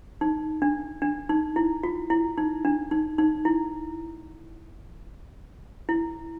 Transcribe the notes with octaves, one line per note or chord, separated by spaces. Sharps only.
D#4
D4
D4
D#4
E4
F4
E4
D#4
D4
D#4
D#4
E4
E4